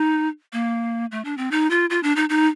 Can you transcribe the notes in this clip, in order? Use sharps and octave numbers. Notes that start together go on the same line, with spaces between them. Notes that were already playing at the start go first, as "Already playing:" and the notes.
Already playing: D#4
A#3
A3
D4
C4
D#4
F4
F4
D4
D#4
D#4